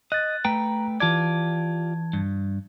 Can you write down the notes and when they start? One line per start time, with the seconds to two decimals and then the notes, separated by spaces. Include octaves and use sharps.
0.12 D#5 F#6 A6
0.45 A3 B4 G5 A#5
1.00 E3 F4 G4 D5 A5 G#6
2.13 G2